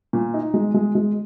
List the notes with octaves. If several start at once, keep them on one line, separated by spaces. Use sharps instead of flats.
A#2
D#4
G#3
G#3
G#3